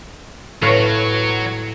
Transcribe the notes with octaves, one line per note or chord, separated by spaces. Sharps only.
A2 F#3 B4 F5